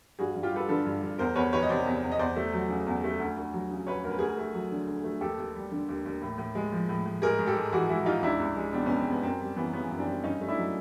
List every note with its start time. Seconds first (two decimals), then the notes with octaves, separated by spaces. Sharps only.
0.19 G2 F#4 G#4
0.35 G2
0.43 F4 G4
0.52 G3 A4 B4
0.69 D3 A4 B4
0.85 G2
1.02 G2
1.19 E2 A#4 C5
1.35 E2 B4 C#5
1.53 D#3 B4 C#5
1.63 D#5
1.69 C3 C5 D5
1.86 E2
2.03 E2
2.12 D#5
2.19 E2 C5 D5
2.37 A3
2.53 F#3
2.70 C#3
2.86 E2
3.04 A3
3.20 D2
3.37 D2
3.54 F#3
3.71 C#3
3.87 D2 B4 C#5
4.03 D2 A#4
4.11 B4
4.19 D2 G#4 A#4
4.37 A3
4.54 F#3
4.71 D3
4.88 D2
5.04 A3
5.21 D#2 G4 A4
5.38 D#2
5.55 G3
5.72 D3
5.89 D#2
6.06 D#2
6.22 A2
6.38 A2
6.55 G#3
6.72 F3
6.89 A2
7.06 A2
7.22 G#2 G#4 A#4
7.39 G#2
7.47 G4 A4
7.56 G#3
7.72 E3 F#4 G#4
7.89 G#2 E4 F#4
8.06 G#2 D#4 F4
8.23 C#2 D4 E4
8.40 C#2
8.57 G#3
8.73 B2 C4 D4
8.86 C#2 B3 C#4
8.98 C4
9.07 C#2 B3
9.23 F#2 C4
9.41 G3
9.56 E3 B3 C#4
9.73 C#3 B3 C#4
9.91 F#2
9.99 C4 D4
10.08 G3
10.24 G2 C#4 D#4
10.41 A3
10.48 D4 E4
10.58 F#3